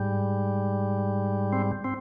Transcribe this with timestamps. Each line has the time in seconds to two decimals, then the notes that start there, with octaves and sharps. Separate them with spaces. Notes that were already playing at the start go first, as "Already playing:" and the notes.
Already playing: G#2 G3
1.53 C4
1.84 C4